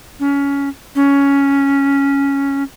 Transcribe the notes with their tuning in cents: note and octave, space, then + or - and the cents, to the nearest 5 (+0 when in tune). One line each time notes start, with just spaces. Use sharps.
C#4 +20
C#4 +5